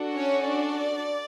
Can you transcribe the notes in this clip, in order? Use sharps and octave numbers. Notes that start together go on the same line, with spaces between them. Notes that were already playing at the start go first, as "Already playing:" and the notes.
Already playing: D4 F#4 A4
C#4 C#5
D4 D5